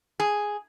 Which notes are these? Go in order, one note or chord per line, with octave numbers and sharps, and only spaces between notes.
G#4